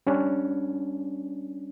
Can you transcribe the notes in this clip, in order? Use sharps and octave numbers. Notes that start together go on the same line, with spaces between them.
G3 C#4 D4